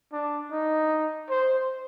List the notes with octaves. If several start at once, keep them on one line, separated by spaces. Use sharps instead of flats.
D4
D#4
C5